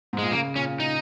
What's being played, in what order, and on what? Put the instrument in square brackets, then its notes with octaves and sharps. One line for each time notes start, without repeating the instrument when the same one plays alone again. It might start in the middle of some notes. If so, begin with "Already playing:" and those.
[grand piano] G#2
[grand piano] A#2 [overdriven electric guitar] G#3
[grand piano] C#3 [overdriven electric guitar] A#3
[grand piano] A#2 [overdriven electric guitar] C#4
[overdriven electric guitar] D#4